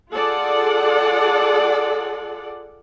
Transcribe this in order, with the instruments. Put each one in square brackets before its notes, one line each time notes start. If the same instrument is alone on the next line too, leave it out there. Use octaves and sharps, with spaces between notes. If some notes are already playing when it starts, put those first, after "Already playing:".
[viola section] F4 G#4 A4 D5 F#5